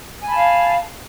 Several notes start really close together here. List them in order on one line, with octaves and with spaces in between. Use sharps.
G#5 B5 A5 F5